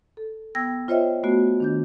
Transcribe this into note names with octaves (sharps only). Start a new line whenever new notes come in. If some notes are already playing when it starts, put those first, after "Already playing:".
A4
B3 G5 E6 G#6 A#6
F4 C5 C#5 D#5 E5 G5
A3 B3 F#4
D#3 D4 G6